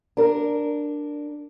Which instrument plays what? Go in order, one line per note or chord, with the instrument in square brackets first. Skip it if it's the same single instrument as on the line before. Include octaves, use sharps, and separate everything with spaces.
[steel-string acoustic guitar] D4 A#4